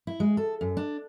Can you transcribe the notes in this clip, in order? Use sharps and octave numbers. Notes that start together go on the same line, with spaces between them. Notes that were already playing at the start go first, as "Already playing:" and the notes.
E4
G#3
A4
F#2
D4